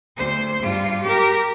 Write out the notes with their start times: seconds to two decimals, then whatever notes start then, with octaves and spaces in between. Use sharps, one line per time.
0.17 D2 C5
0.61 G2 F4
1.02 G4 A#4